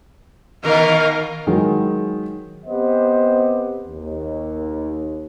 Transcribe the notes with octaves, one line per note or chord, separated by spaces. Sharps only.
B2 D#3 E3 A#4 F5
D#3 F#3 G#3 G#4
B3 C4 G4 C5 D#5
D#2